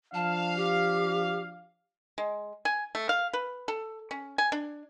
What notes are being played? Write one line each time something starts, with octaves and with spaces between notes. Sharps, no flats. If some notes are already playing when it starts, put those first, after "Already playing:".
F3 D4 F5 A5
G4
G#3
G#5
A3
F5
B4
A4
C#4
G#5
D4